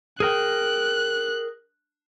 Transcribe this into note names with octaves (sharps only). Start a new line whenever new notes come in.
G#4 A#4 G5 F#6